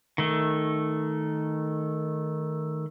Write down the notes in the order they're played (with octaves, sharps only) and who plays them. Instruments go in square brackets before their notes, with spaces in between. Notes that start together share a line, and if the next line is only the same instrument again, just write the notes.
[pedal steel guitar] D#3 A3